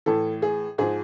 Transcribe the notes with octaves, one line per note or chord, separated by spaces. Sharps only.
A2 E3 A4
G#4
G#2 F3 G#4